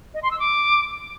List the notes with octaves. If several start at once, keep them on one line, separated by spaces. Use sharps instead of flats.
D#5
C6
E6
D6